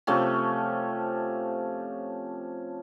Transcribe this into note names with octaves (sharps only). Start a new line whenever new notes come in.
C3 F3 A3 C#4